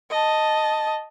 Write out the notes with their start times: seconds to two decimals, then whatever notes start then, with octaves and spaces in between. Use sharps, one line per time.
0.10 D#5 A5